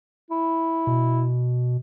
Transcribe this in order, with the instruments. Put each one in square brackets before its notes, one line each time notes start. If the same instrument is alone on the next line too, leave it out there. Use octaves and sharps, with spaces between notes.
[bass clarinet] E4
[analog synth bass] B2